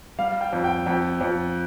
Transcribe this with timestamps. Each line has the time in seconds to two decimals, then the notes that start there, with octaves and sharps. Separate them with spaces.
0.19 G3 F5
0.41 G5
0.53 F2
0.64 G5
0.86 F2 G5
1.21 F2